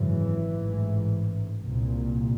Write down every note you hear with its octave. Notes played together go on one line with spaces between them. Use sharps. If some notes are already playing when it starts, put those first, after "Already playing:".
Already playing: G#1 F#2 C#3 E3
A1 G#2
C2 A#2